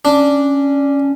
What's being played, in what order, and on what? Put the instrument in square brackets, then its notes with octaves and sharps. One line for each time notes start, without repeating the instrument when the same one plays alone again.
[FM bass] C#4 [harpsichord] D4